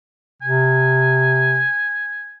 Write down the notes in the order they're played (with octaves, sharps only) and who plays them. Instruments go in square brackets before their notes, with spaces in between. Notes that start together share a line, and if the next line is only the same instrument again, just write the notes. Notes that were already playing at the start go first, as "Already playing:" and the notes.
[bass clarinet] C3 [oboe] G#5